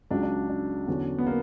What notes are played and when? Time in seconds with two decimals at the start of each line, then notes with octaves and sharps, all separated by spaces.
0.10 C#2 C#3 F#3 D4
0.23 D4
0.49 D4
0.87 E2 D3 F#3 C#4
1.18 B3
1.27 A#3